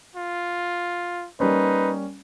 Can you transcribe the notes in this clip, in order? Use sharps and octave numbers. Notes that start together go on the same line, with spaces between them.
F4
G3 A#3 C#4 D#4 B4